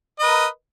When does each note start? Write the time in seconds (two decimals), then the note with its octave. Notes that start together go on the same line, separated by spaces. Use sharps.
0.19 D#5
0.23 B4
0.27 A#4